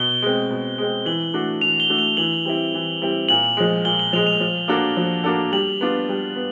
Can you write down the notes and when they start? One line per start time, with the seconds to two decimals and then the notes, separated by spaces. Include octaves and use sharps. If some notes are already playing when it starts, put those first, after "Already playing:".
Already playing: B2 G7
0.22 G#3 C4
0.50 B2
0.78 G#3 C4
1.05 E3 F#7
1.34 A3 D4 F#4
1.61 E3 F7
1.80 G7
1.90 A3 D4 F#4
1.99 F7
2.17 E3 F#7
2.45 G3 C4 E4
2.74 E3
3.02 G3 C4 E4
3.29 A#2 F#7
3.57 F3 G#3
3.84 A#2 G7
3.99 F#7
4.13 F3 G#3 F7
4.27 F7
4.40 F3
4.68 A#3 D4 F#4 A4
4.97 F3
5.24 A#3 D4 F#4 A4
5.52 G3 F#7
5.81 B3 D4 F4
6.09 G3
6.36 B3